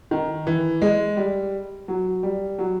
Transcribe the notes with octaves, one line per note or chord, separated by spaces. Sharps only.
D#3
E3
G#3
G3
F#3
G3
F#3